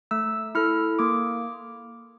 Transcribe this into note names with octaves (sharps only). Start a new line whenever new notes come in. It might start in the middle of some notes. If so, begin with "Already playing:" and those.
A3 E6
E4 A4 F6
A#3 D6